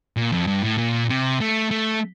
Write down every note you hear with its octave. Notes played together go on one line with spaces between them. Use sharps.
A#2
F2
G2
A2
A#2
C3
A3
A3